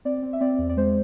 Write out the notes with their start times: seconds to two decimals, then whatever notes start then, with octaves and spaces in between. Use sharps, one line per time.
0.05 C4 D5
0.23 C4
0.33 E5
0.41 C4 D5
0.58 E2
0.69 D5
0.77 G#3 C5